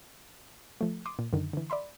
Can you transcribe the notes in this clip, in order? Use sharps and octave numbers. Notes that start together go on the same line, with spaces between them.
F3 A3
C6 D6 D#6
A#2
F#2 D3 D#3
D3 E3
D5 E5 B5 C6